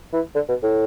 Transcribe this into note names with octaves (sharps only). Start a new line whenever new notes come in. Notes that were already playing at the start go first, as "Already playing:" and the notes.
E3
D3
B2
A2